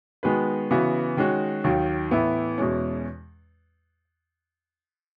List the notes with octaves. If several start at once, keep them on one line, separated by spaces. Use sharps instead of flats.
D#3 G#3 B3 F#4 B4
C#3 E3 B3 F#4
D#3 G#3 C#4 F#4
D#2 D#3 F#3
A2 E3 B3 E4
E2 B2 G#3 C#4